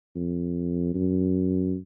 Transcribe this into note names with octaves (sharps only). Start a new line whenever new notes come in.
F2
F#2